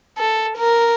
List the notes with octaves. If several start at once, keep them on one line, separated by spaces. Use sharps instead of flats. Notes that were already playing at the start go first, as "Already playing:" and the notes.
A4
A#4